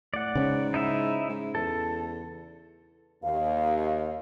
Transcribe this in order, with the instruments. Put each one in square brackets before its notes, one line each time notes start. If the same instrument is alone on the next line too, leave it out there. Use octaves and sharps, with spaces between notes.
[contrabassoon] A2 [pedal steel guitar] D5 F#5
[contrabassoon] G#2 [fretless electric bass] C#3 C4 C#4
[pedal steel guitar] D#4 E4 E5
[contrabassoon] G#2
[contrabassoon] E2 [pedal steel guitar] A4
[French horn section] D#2 [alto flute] F5